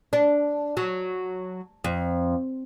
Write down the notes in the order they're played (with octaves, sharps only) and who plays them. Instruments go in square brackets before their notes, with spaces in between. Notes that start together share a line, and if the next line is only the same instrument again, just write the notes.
[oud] D4
F#3
F2